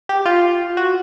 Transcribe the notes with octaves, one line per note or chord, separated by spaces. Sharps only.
G4
F4
F#4